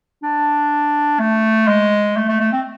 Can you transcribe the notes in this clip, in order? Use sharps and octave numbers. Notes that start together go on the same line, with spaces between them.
D4
A3
G#3
A3
A3
A3
C4